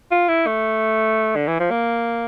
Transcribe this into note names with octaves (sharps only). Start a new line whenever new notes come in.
F4
E4
A3
D3
E3
F3
A#3